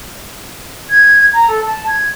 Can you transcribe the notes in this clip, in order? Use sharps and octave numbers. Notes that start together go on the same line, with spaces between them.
G#6
A#5
A4
A5
G#6